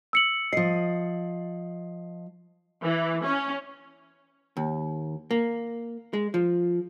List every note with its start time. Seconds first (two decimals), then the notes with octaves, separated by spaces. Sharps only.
0.13 E6 C#7 F#7
0.53 F3 D#5 C7
2.82 E3
3.25 C#4
4.57 D#2
5.31 A#3
6.13 G#3
6.34 F3